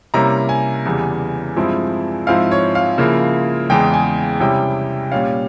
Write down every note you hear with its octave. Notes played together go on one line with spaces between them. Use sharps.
C3 G3 A#3 C#4 E4 A#5
G#5
E2 C#3 E3 G3
G2 F3 G#3 C4 E4
G#2 F3 C4 E4 F5
C#5
F5
C#3 F3 A#3 E4
E2 C#3 E3 G#3 G5
G#5
C3 G3 C#4 E4 G5
A#2 G3 C#4 F5